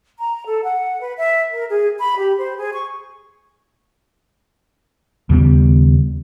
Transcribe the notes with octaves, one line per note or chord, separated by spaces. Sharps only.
A#5
A4
F#5
B4
E5
A#4
G#4
B5
G4
C5
G#4
C#6
D#2 C#3 G3 B3